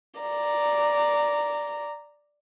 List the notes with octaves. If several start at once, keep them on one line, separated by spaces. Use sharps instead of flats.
D5 A#5